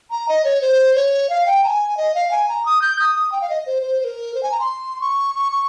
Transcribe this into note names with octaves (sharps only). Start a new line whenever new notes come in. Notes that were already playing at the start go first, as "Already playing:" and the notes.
A#5
D#5
C#5
C5
C#5
F5
G5
A#5
G#5
D#5
F5
G#5
A#5
D#6
G6
D#6
D#6
G5
F5
D#5
C5
C5
C5
A#4
C5
G#5
A#5
C6
C#6
C#6
C#6